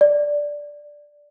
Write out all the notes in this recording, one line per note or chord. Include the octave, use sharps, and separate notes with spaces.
D5